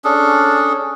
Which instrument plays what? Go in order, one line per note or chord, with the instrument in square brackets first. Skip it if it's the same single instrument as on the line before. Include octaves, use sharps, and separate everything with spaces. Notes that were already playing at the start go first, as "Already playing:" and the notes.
[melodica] C#4 D4 G#4 A4